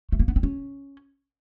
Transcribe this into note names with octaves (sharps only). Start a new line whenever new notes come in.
A3
A#3
B3
C4
C#4